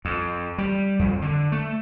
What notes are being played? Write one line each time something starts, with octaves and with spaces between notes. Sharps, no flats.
F2
G3
F2
D3
A3